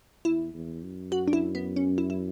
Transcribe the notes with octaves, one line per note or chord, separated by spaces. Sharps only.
E2 E4
E2
F#2
F#4
D4
E4
B3
C#4
E4
E4